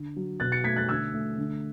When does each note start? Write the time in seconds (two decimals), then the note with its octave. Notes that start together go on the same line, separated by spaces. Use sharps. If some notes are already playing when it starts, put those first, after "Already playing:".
Already playing: D3
0.16 F#3
0.40 B2 F#6 A6
0.52 A6 C#7
0.64 A3 G#6 B6
0.76 F#6 A6
0.89 D3 E6 G#6
1.14 A3
1.38 D3